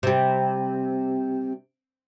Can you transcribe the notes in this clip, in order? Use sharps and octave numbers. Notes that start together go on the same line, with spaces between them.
C3 G3